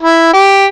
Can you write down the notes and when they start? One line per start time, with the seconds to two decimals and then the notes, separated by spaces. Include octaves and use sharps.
0.02 E4
0.33 G4